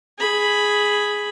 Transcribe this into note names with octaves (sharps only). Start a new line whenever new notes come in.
G#4 B5